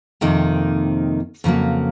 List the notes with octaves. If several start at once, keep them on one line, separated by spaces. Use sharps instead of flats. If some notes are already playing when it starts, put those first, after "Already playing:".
F2 C3 D#3 A#3 D#4
F2 C#3 F#3 A#3